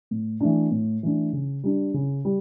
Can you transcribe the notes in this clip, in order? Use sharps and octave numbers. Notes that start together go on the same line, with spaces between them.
A2
E3 A3 D4
A2
E3 A3 D4
C#3
G3 D4
C#3
G3